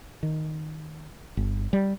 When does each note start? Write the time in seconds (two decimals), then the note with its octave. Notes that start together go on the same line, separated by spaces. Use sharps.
0.23 D#3
1.37 G1
1.73 G3